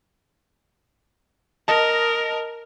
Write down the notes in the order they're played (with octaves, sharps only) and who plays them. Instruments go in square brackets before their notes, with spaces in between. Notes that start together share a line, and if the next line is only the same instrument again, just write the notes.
[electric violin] A#4 [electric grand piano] D#5 A5